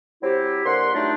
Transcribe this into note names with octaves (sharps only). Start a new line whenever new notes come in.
F#3 C4 E4 G4
D3 A#3 F#5 C6
F#3 G3 A3 D4 D#4 F4